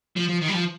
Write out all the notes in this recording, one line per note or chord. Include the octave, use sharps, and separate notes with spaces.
F3
F3
D#3
G3
F3